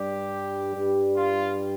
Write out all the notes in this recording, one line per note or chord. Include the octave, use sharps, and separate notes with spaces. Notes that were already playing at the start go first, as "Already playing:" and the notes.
Already playing: G2 G3 G4
G2 G3
F4